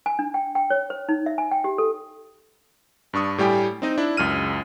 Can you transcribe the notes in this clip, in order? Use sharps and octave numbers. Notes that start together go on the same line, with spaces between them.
G#5
D4
G5
G5
C#5
C5
D#4
E5
G#5
G5
G4
A4
G2 D4 C#6 D#6
A2 G3 G4 G5 G#5
C4 D#4 D#5
D4 E4
C#2 F#2 F6 D#7